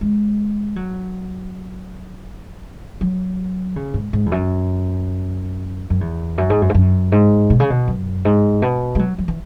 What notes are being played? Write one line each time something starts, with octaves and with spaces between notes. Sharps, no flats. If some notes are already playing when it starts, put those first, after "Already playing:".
G#3
F#3
F#3
C#3
G#2
G#2
E2
F#2
F#2
E2
F#2
G#2
F#2
G#2
F#2
G#2
B2
C#3
B2
F#2
G#2
B2
G#3
F#3
F#3
E3